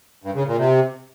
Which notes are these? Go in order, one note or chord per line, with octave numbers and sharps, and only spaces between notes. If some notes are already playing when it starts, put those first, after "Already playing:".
G2
C#3
A#2
C3